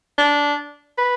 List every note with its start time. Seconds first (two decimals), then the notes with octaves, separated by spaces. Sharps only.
0.18 D4
0.98 B4